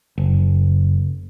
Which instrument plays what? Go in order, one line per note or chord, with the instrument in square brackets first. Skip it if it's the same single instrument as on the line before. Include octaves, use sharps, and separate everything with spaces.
[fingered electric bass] F#1